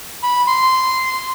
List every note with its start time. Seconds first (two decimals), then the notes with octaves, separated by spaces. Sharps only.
0.23 B5
0.47 C6